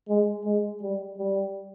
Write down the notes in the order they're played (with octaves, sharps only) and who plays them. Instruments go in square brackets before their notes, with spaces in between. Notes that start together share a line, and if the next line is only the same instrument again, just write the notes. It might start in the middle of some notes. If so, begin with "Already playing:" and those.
[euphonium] G#3
G#3
G3
G3